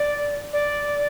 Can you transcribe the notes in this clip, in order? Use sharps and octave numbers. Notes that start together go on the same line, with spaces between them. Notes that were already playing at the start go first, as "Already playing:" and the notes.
Already playing: D5
D5